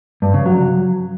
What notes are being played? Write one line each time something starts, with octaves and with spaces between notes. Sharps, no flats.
G2
C#3
F#3